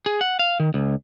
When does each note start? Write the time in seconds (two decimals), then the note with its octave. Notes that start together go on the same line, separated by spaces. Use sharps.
0.06 G#4
0.21 F#5
0.39 F5
0.60 D#3
0.74 C#2